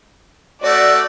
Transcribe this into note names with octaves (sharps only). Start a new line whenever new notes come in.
A3 F#4 D5